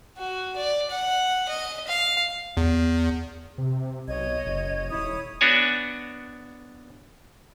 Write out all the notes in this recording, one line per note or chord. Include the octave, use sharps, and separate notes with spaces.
F#4
D5
F#5
D#5
F5
E2
C3
B1 C#5 D#5 G#6
F#1
D#1 E4 C#5 D#6
B3 D4 F#4 C#5 G#5